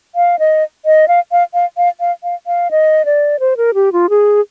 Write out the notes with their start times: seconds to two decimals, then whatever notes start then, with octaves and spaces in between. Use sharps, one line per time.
0.15 F5
0.39 D#5
0.86 D#5
1.08 F5
1.32 F5
1.54 F5
1.77 F5
2.00 F5
2.23 F5
2.47 F5
2.71 D#5
3.05 D5
3.40 C5
3.57 A#4
3.74 G4
3.93 F4
4.10 G#4